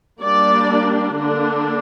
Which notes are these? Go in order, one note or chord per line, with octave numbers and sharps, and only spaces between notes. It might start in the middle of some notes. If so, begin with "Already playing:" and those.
G3 A#3 D4 D5
D3 A#3 D4